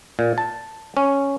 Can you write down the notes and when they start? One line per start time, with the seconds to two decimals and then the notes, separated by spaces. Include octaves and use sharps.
0.19 A#2
0.38 A5
0.97 C#4